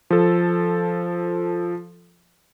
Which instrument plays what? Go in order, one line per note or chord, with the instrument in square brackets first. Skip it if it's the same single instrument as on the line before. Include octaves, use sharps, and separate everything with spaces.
[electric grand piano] F3 A4